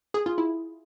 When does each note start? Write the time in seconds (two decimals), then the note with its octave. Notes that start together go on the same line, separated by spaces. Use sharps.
0.14 G#4
0.26 F4
0.38 E4